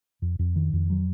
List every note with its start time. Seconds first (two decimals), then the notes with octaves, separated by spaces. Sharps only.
0.22 F2
0.39 F2
0.56 D#3
0.73 F2
0.90 F#3